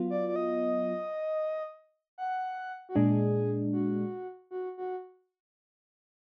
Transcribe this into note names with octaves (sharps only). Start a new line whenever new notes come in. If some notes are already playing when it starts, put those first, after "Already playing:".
Already playing: F#3 B3 F4
D5
D5
D#5
F#5
F#4
A#2 G#3 D4 G#4
F#4
F#4
F#4